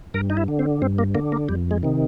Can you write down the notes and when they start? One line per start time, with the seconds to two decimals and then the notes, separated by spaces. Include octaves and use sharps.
0.14 G2 A#4
0.30 D#4
0.37 E4
0.48 D3
0.59 C4
0.82 G2 C4
0.98 A#3
1.15 D3 A#3
1.32 A#3
1.49 F2 G3
1.71 G#3
1.83 C3 D#3